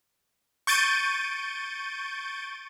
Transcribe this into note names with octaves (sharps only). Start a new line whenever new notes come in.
C#6 G6 A6 D7 D#7